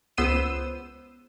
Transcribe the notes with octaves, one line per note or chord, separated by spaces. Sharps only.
C#2 B3 C5 E6 D#7 E7